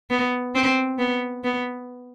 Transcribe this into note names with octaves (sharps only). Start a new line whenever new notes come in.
B3
C4
B3
B3